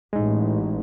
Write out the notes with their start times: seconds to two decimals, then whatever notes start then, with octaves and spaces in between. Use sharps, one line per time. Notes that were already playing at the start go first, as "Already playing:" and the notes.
0.13 A1 G#3 D#4